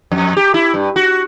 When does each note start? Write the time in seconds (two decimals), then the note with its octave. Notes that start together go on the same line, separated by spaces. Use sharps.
0.11 F2
0.37 G4
0.54 E4
0.74 G2
0.96 F#4